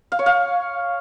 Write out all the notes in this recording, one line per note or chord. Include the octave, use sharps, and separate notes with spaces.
F5
C#5
F5